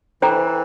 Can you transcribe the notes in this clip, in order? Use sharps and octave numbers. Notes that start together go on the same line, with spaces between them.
E3 D4 A4 C5 G5 A#5